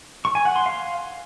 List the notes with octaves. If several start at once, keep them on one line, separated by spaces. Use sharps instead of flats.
C#6
G#5
F#5
C6
F5